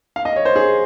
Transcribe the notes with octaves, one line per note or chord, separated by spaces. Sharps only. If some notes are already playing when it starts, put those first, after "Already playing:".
F5
D#5
C#5
C5
G#4